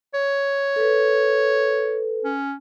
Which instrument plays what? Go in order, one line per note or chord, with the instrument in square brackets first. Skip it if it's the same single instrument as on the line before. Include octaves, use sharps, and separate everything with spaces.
[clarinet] C#5
[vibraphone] A4 B4
[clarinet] C#4